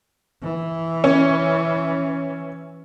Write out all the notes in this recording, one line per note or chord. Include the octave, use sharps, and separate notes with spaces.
E3
C#4